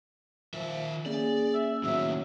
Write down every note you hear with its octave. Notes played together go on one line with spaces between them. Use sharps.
D#3 F3 A#4 E5
A#3 C#4 G#4 D5
E5
A2 D#3 F#3 B3 E5